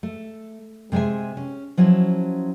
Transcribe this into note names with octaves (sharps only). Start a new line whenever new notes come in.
A3
C3 G#3 B4 E5 G#5
C#4
F3 F#3 C#4 E4